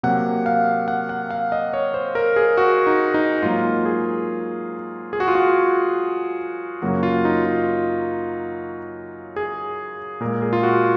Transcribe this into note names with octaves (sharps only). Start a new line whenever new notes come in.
C3 F#3 A#3 F#5
F5
F#5
F#5
F5
D#5
C#5
C5
A#4
G#4
F#4
D#4
D#4
G#2 F#3 A#3 F4
G#4
G#4
F#4
F4
F#4
F#2 C#3 F#3 A#3 F#4
F4
D#4
F4
G#4
A#2 G#3 A#4
G#4
F4
F#4